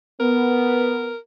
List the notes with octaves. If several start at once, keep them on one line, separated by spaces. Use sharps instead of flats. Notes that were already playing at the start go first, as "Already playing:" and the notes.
B3 A#4